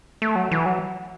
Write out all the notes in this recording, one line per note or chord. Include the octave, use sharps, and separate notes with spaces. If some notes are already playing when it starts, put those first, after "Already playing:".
A3
F#3
E3
F#3